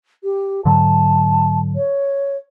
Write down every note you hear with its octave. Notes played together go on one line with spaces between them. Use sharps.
G4
G#2 D3 F#3 A5
C#5